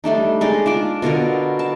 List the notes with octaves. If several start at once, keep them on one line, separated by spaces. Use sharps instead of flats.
G3 A3 D4 D#4
G#3 D#4 D5
D4 F4 D6
B2 D3 F4 A#4
A5